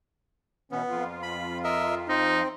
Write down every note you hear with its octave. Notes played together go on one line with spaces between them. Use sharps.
B2 E3 B3 C#4
F2 F4
B5
A#4 D#5 E5
C4 D#4